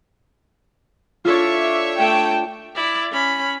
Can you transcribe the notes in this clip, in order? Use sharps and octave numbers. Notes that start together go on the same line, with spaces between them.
D4 F4 A4 C#5 E5
A3 G5 A5
E4 D5
C#4 B5